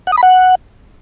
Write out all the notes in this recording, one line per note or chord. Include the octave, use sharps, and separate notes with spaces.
F#5
D#6
B5
F#5